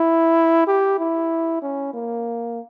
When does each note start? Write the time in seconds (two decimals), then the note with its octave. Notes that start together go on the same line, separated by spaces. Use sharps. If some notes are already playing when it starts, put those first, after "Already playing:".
Already playing: E4
0.67 G4
0.99 E4
1.62 C#4
1.94 A#3